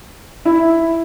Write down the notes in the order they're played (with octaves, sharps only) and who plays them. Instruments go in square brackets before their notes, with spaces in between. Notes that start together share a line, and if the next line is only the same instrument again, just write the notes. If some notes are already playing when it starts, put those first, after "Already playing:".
[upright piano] E4